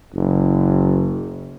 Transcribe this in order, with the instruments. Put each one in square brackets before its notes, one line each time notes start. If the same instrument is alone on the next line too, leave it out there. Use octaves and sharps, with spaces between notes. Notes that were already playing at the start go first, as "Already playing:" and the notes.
[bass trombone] F#1